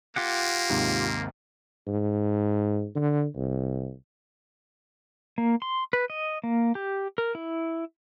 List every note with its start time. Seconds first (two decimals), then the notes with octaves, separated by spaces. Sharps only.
0.16 A#3 F4 G4 F#5
0.70 D#2 G#2 C3
1.87 G#2
2.96 D3
3.35 C2
5.38 A#3
5.62 C6
5.93 B4
6.10 D#5
6.44 A#3
6.75 G4
7.18 A#4
7.35 E4